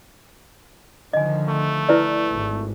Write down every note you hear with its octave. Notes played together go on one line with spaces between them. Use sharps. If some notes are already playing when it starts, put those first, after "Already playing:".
D3 D#3 F3 D#5 G#5
A3
E4 B4 D5
G#1